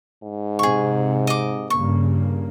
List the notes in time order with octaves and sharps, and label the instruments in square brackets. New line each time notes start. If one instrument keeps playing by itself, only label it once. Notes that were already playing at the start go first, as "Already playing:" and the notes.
[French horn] G#2
[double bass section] C3 [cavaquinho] G#4 C#6
[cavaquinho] D#5 D6
[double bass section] G2 C#3 A#3 [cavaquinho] C#6